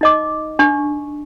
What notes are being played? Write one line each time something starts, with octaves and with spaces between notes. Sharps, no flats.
D#4 D#5 D6
D4 C#6